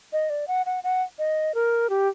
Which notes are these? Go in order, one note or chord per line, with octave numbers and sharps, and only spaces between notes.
D#5
D5
F#5
F#5
F#5
D#5
A#4
G4